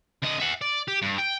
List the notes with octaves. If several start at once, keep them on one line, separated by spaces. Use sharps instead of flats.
D3 D#5
E5 F#5
D5
G4
G2
G5